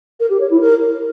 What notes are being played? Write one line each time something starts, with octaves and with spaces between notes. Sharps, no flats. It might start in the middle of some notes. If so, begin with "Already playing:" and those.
A#4
G4
C#5
E4
A#4